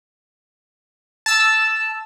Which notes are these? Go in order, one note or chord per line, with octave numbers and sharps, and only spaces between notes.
A5 E6